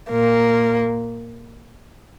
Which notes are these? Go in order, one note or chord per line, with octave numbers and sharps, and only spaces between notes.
A#2 A#3